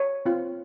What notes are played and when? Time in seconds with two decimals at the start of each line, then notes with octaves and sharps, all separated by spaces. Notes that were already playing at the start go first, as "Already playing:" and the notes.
Already playing: C#5
0.26 C4 F4